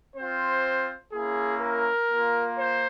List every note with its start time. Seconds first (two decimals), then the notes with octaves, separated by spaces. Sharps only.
0.16 C4 F4 C5
1.13 A#3 C#4 E4 G#4
1.62 A#4
2.10 A#3 F4
2.59 C5